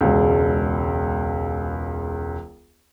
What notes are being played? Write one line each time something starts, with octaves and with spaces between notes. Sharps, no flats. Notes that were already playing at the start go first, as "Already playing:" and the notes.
E1 C#2